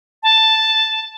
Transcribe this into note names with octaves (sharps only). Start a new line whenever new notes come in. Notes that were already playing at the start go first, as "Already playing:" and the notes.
A5